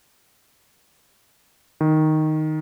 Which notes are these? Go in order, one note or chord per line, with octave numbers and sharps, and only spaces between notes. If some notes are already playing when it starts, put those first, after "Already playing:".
D#3